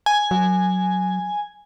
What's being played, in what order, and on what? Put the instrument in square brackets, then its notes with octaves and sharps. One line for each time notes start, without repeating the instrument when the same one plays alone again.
[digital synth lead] G#5
[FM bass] F#3